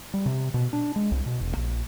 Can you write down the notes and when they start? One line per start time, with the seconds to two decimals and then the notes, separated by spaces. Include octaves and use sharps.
0.14 G3
0.26 C3
0.54 B2
0.73 D4
0.96 G#3
1.12 C2
1.26 B2
1.41 E1
1.57 A#1